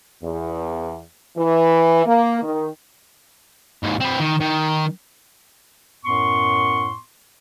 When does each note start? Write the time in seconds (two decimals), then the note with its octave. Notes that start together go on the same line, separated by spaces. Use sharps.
0.23 E2
1.37 E3
2.06 A#3
2.42 D#3
3.83 D#2 G#2
4.00 C4 B4
4.20 D#3
4.40 D#3
6.05 F#2 A2 B3 C6 C#6